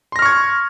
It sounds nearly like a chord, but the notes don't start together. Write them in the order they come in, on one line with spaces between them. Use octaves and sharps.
C6 A#6 F6 C#6 G#6